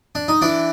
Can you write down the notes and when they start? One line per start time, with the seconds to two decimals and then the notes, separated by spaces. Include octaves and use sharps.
0.15 D4
0.28 D#4
0.41 E3 D4 E4